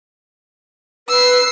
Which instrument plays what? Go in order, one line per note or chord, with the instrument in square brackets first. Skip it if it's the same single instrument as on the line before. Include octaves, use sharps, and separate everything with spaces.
[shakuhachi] B4 [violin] E6 C7